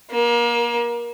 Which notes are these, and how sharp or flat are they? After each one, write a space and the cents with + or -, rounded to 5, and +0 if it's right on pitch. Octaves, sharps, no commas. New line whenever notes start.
A#3 +30